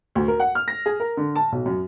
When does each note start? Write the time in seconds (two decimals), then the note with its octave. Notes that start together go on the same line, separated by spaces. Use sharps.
0.15 D2
0.28 A#4
0.40 F#5
0.55 F6
0.68 A#6
0.86 G#4
1.00 A#4
1.17 D3
1.36 A5
1.52 B1
1.66 F#2